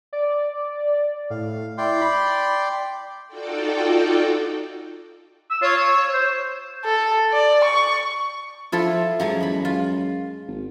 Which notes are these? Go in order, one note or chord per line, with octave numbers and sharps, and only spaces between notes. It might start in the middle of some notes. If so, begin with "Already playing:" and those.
D5
A2 F5
E4 D5 G5 C6
B5
D#4 F4 F#4 A4 D5 G5
E6
F4 C#5
E6
C5
A4
D5
C#6
F3 E4 F4 A4
F#2 F3 F#3 G#3
E2 B5
F4
G#1